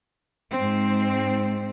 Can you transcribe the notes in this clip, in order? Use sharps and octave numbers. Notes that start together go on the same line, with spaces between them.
G#2 C4